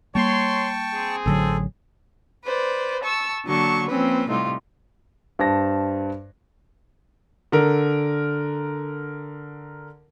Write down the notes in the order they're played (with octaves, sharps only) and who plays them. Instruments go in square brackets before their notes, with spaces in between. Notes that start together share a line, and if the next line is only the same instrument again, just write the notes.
[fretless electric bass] G3 A#3 [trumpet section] C#5 C6 [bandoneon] G5 A5 C#6
[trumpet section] C4 G#4
[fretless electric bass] A1 D3 F#3 [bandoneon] A4
[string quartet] B4 C5 D5
A5 C#6 E6
D3 F#3 A#3 A5 C#6
F3 A#3 C4 C#4 B4
A2 C3 G3 D#4 F4
[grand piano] G2 C5 A5 A#6
D3 A#4